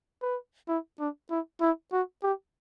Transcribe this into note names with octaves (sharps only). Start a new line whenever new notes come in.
B4
E4
D4
E4
E4
F#4
G4